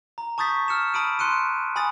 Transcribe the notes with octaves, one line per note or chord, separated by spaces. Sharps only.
A#5
A5 C#6 D#6 G6 A6 B6
E6 F6 C#7 E7
A5 B5 D#6 D7 D#7
C6 F#6 C#7 D#7
G#5 B5 D#6 A6